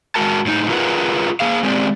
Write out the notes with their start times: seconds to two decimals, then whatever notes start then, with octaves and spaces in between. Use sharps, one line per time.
0.15 G#3 F#4 A#4 A5
0.46 A2 D#4
0.69 F4 G#4 A#4 B4 D5 F#5
1.40 A#3 G#4 F5
1.63 G#3 C4 G4 D5